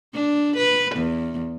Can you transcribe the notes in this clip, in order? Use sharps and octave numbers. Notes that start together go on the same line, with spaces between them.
D4
B4
E2